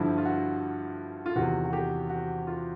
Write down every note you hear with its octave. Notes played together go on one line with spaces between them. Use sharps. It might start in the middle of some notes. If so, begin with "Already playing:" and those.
Already playing: G2 D3 F3 E4
F4
F#4
F4
E2 C3 D#3 F#4
F#4
G4
F#4
F4